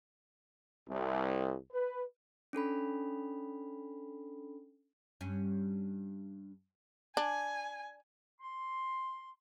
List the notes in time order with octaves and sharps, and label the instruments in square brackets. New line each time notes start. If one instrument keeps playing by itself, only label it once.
[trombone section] C2
B4
[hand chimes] C#4 D4 A4 B5
[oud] G2 C#4
[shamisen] D4 [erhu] G#5
[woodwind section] C6